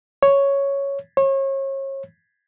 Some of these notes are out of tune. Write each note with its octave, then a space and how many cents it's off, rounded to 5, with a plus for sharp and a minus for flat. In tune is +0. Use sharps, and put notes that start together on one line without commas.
C#5 +0
C#5 -35